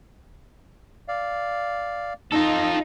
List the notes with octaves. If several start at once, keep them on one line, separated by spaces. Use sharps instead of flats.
D5 F5
D#4 F4 A4